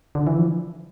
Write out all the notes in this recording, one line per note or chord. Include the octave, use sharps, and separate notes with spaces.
D3
E3
F3